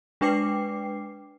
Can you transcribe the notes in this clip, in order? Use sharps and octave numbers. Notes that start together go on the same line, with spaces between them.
G#3 D4 B4 G5 D6 C7